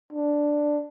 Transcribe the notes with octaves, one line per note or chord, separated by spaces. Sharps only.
D4